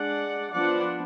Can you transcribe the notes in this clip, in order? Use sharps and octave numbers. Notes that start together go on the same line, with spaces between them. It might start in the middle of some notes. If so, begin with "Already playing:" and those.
Already playing: G#3 D4 D5 F#5
F3 B3 D4 D5 F#5